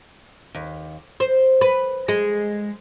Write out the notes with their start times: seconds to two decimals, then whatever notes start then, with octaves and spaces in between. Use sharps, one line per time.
0.55 D#2
1.20 C5
1.61 B4
2.08 G#3